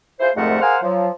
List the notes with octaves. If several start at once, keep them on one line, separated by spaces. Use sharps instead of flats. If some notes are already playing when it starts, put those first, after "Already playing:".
E4 F4 G#4 C5
C2 F2 G#2 A3 A#4 F#5
G#4 A#4 C5 F5 F#5 G#5
F3 F#3